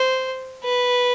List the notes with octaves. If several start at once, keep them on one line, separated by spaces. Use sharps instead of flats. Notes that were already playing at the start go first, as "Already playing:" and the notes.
Already playing: C5
B4